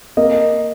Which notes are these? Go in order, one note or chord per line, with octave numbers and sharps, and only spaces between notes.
A#3 D#5